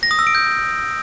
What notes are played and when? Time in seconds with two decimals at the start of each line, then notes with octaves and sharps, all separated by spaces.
0.03 A#6
0.11 D#6
0.19 E6
0.27 D7
0.35 G6